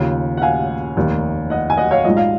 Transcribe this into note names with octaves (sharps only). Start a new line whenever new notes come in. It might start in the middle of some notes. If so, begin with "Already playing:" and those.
Already playing: D#2 C#3 F3
F#5
F5 G#5
F1 D#2 D#3
D#5 F#5
G#5
D#5 F#5
C#5 F5
A#1 G#2 F3 D#5
F5